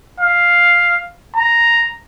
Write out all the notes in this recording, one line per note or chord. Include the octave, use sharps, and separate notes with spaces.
F5
A#5